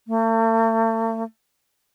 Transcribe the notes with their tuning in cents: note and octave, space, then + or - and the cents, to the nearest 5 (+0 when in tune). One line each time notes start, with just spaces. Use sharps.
A3 +40